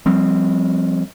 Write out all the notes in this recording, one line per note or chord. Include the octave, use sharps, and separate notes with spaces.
F3 G3 C4